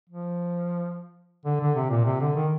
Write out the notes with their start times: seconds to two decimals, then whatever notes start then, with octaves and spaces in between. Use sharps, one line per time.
0.10 F3
1.45 D3
1.60 D3
1.75 C3
1.90 A#2
2.05 C3
2.21 D3
2.36 D#3